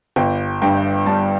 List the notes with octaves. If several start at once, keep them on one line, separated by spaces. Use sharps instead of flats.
G1 G5
G2 G5
G3 A5